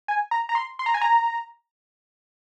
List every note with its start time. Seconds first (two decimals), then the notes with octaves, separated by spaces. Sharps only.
0.08 G#5
0.31 A#5
0.49 A#5
0.55 C6
0.79 C6
0.86 A#5
0.94 G#5
1.01 A#5